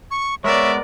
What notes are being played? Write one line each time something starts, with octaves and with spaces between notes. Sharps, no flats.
C#6
G#3 B3 A#4 C#5 D5 E5